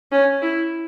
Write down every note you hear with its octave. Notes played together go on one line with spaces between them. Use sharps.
C#4
E4